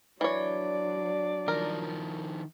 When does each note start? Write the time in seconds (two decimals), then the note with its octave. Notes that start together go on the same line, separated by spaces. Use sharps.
0.21 E3 F#3 D4 C#5 D5
1.48 D#3 F3 A#4